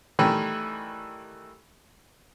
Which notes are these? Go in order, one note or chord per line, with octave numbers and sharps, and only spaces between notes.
D#3 E3 G3 A3